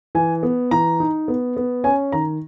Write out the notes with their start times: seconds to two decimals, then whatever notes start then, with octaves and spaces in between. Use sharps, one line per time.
0.15 E3 G#5
0.43 B3
0.71 E3 A#5
1.00 D#4
1.28 B3
1.57 B3
1.84 C#4 G#5
2.12 D#3 A#5